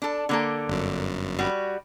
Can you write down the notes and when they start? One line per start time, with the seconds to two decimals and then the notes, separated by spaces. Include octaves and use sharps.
0.02 D4 A4
0.29 D3 A#3 A4
0.68 G1 F#2
1.39 G3 F#4